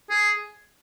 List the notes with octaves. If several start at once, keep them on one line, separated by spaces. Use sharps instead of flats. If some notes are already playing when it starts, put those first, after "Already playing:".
G#4